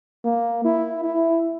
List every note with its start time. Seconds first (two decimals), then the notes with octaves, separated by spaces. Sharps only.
0.25 A#3
0.65 E4
1.04 E4